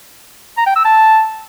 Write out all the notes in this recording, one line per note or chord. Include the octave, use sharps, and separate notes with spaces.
A#5
G5
E6
A5